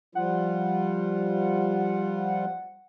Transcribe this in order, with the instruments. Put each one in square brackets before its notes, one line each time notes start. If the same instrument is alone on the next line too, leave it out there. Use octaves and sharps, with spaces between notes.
[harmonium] F3 G3 F4 [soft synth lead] F#5